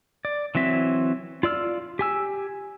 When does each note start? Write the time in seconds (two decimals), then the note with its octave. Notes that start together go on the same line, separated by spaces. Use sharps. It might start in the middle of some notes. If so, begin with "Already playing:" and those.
0.25 D5
0.55 E3 F#3 C4 E5
1.43 F4 D5 E6 F6
1.99 G4 G#5 E6